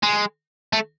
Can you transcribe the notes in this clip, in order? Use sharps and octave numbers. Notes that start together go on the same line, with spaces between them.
G#3
A3